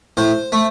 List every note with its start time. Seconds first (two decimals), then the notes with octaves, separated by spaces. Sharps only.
0.17 A2 C5
0.52 A3